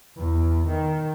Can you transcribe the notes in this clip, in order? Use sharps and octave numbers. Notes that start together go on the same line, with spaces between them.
E2
D#3